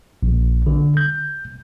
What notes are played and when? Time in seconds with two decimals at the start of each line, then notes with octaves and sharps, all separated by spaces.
0.23 A#1
0.66 D3
0.97 G6